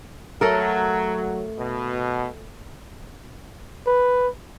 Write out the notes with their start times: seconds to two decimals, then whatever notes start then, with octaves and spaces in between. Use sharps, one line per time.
0.41 F#3 A3 A4 A#4
1.58 B2
3.87 B4